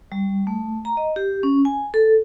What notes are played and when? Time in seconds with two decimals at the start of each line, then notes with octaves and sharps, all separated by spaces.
0.12 G3
0.47 A3
0.85 A#5
0.97 D#5
1.16 G4
1.43 C#4
1.65 G#5
1.94 A4